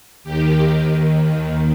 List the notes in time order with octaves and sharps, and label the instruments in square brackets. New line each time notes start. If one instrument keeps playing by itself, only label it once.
[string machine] D#2 D#3 G4